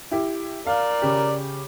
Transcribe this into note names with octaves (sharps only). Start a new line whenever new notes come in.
E4 G4
A#4 D5 F5
C#3 G4